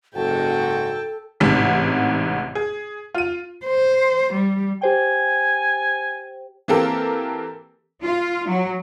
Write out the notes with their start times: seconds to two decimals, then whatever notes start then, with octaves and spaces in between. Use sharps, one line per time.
0.15 F#1 G#2 F#4 A4 G5 A5
1.40 A1 G#2 C3 B6
2.55 G#4
3.15 F4 D#7
3.65 C5
4.33 G3
4.82 G4 C5 G5 G#5
6.68 E3 A#3 C4 G4 A4 A#4
8.03 F4
8.48 F#3